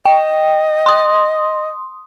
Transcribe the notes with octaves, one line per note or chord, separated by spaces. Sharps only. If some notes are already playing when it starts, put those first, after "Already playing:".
D#5 G5
C6 D#6